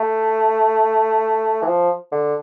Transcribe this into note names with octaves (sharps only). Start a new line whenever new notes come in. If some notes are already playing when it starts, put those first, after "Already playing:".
Already playing: A3
E3
F3
D3